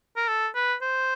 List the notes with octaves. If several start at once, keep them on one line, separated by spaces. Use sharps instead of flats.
A#4
A4
B4
C5